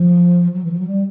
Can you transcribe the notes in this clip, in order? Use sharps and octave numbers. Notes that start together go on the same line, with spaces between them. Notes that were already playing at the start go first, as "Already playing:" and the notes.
Already playing: F3
F#3
E3
F3
F#3
G3